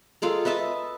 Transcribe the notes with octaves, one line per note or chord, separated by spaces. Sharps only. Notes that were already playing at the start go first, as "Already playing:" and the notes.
G#3 F4 A4 A#4
B4 D#5 E5 A5